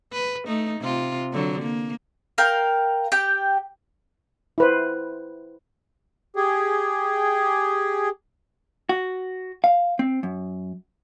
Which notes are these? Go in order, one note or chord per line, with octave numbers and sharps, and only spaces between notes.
B4
A3 D#4
C3 F4
D3 F#3
A#3
A#4 F5 G5
G4 G5
E4 B4 C5
G4 G#4
F#4
F5
C4
F#2